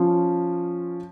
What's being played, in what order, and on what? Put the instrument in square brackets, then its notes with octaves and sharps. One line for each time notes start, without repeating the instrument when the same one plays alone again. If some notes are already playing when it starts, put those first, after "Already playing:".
Already playing: [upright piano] F3 C#4 F4